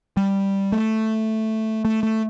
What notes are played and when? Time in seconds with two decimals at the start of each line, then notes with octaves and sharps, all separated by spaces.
0.17 G3
0.72 A3
1.85 A3
2.03 A3